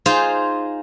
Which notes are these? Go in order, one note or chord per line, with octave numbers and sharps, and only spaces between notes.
D#4 F4 G#4 C5 F5